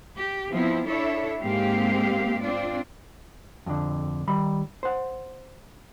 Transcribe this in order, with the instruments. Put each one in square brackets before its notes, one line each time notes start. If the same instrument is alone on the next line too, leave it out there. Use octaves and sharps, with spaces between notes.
[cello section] G4
F3 B3 C4 E4
D4 E4 A4 C#5 E5
G#2 G#3 A#3 C4 G4 F5
C4 D4 F4 D5
[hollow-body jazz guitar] F2 D3
D#3 G3 B5
C5 F#5